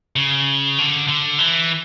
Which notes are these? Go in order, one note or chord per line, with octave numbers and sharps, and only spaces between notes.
C#3
D3
D3
E3